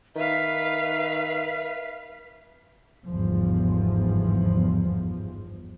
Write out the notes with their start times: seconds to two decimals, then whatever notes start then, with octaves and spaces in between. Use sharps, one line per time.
0.16 D#3 B4 E5 F5
3.05 G1 E2 G#2 F3